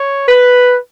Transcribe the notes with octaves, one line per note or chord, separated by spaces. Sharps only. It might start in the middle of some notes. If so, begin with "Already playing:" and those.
Already playing: C#5
B4